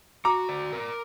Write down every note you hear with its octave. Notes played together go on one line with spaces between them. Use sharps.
F#4 A#5 D6
D5
A#4